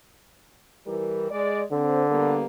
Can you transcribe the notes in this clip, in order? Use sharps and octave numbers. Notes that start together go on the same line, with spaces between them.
E3 G3 A#4
G#3 D5
D3 C4
G3 A#3 B3